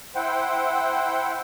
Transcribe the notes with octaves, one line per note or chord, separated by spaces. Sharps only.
E4 C5 F#5 G5